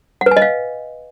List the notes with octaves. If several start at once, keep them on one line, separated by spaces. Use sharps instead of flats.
F#5
B4
G#5
D#5
F5